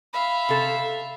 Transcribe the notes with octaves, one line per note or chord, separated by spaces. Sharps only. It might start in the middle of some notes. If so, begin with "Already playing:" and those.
E5 F5 B5
C3 A4